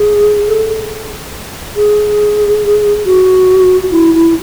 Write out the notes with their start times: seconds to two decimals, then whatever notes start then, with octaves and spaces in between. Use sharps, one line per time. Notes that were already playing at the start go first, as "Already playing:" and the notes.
Already playing: G#4
0.48 A4
1.76 G#4
3.06 F#4
3.91 E4
4.14 E4